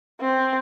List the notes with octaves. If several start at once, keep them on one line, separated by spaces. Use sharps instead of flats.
C4